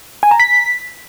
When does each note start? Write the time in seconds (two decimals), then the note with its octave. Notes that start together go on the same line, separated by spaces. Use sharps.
0.23 G#5
0.31 A#5
0.40 B6